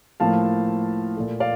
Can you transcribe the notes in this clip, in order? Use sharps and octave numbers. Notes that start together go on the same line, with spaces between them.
A2 F3 A#3 F5 A5
A#2 A3
D5 F5